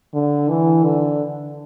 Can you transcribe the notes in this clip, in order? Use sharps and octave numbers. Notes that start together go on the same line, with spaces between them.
D3
E3
D3